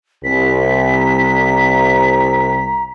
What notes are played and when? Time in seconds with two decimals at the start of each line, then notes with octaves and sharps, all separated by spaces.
0.24 C2 B6
0.95 A#5